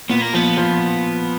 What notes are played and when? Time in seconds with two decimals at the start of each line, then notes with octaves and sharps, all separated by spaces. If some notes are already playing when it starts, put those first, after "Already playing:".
0.10 A#2 B3
0.22 A#3
0.33 F3 B3
0.57 F3